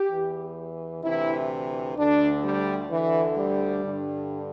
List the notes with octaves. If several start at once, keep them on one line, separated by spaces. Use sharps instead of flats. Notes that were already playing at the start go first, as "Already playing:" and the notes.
Already playing: G4
E2 E3
D2 C3 E3 E4
D2 D3 D4
G3
D2 D3 E3
G3
G2 D3